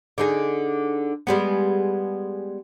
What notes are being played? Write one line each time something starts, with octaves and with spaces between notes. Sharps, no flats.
D3 D#4 G#4
G3 G#3 B3